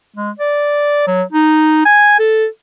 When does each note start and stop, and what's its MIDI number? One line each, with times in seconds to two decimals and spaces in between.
0.16 0.31 56
0.39 1.02 74
1.07 1.22 54
1.32 1.83 63
1.85 2.19 80
2.19 2.46 69